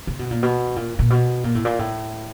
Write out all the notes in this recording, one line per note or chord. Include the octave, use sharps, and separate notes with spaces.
C3
B2
A#2
B2
A#2
A#2
B2
A#2
A2
A#2
A2